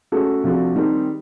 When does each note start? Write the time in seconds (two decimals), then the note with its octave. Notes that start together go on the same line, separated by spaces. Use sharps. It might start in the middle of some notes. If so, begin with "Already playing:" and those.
0.12 A3 C#4 F#4 A4
0.44 C3 F3 A3 D4 F#4
0.76 D#3 G3 C4 D#4